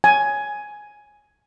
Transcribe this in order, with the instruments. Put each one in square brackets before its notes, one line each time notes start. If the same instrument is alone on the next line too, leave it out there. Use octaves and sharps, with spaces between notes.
[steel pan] G#5